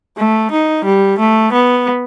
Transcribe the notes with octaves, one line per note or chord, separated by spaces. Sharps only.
A3
D#4
G3
A3
B3